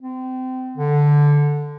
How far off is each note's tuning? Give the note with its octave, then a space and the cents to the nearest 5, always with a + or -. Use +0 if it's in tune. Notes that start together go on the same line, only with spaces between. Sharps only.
C4 -25
D3 -5